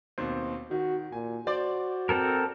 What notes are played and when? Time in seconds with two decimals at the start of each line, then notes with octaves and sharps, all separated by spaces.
0.18 D#2 B2 C4
0.71 D#3 F#4
1.12 A#2 G#5
1.47 F#4 C5 D5
2.09 C4 A4 A#4